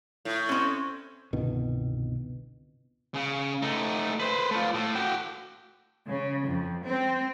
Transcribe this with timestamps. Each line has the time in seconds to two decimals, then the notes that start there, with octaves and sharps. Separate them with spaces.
0.25 A2
0.49 C4 C#4
1.33 G1 C2 B2 D#3
3.14 C#3
3.62 A3 D#4
4.20 B4 C5
4.51 A3 F4
4.73 A2
4.95 F#4 G5
6.06 C#3
6.44 F2
6.83 C4